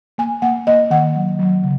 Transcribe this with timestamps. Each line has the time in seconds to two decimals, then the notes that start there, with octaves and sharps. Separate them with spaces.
0.18 A#3 G#5
0.42 A#3 F#5
0.67 A#3 D#5
0.91 D#3 F#5
1.15 F#3
1.39 F#3
1.63 C#3